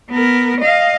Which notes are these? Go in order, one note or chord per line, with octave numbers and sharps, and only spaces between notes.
B3 A#4
D#5 F5